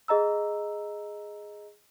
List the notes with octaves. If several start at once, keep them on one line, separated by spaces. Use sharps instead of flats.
G#4 D#5 A#5 E6